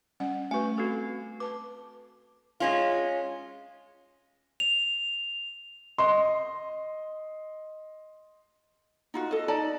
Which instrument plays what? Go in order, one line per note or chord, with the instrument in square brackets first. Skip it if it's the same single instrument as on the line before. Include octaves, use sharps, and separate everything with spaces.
[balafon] G3 C#4 F#5
[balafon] A3 F#4 B4 [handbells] G#5 C#6
[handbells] C4 F#4 [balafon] A4
[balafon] B4 A5 [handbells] D6
[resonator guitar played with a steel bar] G#3 C#4 F4
[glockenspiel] F7
[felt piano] D#5 C6
[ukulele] D#4 F4 F#4
A4 D#5
D#4 D5 A5